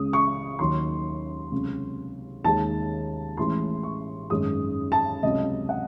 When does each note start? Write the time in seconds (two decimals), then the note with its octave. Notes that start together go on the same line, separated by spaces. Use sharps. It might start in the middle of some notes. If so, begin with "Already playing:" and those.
Already playing: C#2 C#3 G#3 D#6
0.13 C#6
0.59 D#2 D#3 F#3 C6
1.52 C#2 C3 F#3
2.44 D#2 D#3 G#3 A5
3.37 A1 A2 E3 G#3 C6
3.83 C#6
4.30 G#1 F#2 D#3 G#3 D#6
4.92 A5
5.23 C#2 C3 F#3 D#5
5.69 F#5